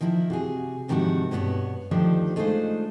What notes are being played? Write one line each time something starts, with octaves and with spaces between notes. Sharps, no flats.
D#3 F3 E4 A4 A#4
C3 F#4 G#4
G#2 C3 D#3 F3 D4 F#4
G2 B2 B3 G#4 C#5
D2 D#3 F3 D4 D#4 G4
G#3 A3 D4 D#4 F4 C5